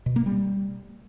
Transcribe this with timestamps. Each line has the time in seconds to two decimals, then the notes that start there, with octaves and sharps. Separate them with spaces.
0.06 B2
0.16 A#3
0.26 G3